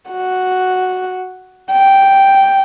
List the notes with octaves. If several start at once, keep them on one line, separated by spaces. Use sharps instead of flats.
F#4
G5